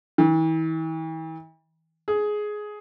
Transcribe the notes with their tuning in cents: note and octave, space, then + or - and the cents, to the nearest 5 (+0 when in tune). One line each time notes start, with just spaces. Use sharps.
E3 -40
G#4 +15